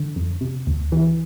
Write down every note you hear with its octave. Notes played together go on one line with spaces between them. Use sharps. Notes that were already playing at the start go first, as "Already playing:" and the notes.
Already playing: D3
F2
C3
D2
E3